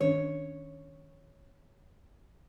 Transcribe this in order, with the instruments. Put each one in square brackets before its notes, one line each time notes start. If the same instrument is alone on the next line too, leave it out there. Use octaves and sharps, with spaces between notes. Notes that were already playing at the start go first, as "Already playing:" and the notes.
[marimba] D#3 C#4 D4 [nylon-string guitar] C#5